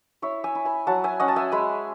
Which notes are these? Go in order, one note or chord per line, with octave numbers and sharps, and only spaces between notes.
E4 C#5 E5
E5 G#5
E4
G#5 B5
F#3 F#5 A5
E5 G#5
C#4 D#5 F#5
A5
E5 G#5
G#3 G#5 B5